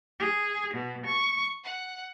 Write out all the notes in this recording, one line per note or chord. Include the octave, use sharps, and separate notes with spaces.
G#4
B2
C#6
F#5